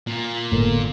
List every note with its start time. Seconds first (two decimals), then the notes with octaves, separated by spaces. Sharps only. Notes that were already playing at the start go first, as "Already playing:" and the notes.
0.07 A#2
0.52 G1 A2 A3 A#3